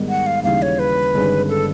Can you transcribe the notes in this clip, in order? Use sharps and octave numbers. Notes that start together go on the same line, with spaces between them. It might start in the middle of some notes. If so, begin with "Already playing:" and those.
Already playing: G#2 D#3 G3 B3
F#5
F5
D#2 C#3 E3 G3 F5
C#5
B4
G1 G2 D#3 G#3 C#4
A4